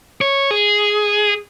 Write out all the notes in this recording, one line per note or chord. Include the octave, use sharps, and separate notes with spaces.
C#5
G#4